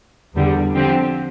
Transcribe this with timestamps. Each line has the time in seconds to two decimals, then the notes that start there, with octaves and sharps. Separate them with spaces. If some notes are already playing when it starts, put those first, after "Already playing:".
0.35 E2 D3 G3
0.75 D3 F3 C4 G4